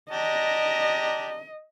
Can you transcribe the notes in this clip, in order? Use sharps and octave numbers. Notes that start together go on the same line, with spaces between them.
D4 G4 D#5 A#5